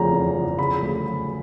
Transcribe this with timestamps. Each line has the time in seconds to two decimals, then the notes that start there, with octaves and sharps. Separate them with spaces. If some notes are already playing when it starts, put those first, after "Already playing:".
Already playing: F1 E2 C#3 F3 A#5
0.11 E2
0.35 F3
0.59 C#3 B5
0.82 D2
1.07 F#3